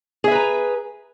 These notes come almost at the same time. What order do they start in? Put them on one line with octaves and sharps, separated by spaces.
G#4 E5 B4 A#5